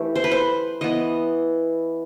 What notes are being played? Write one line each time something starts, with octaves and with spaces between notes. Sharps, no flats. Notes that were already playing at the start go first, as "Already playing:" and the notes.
Already playing: E3 A3 G4
C5
B4
C5
E3 B3 D#5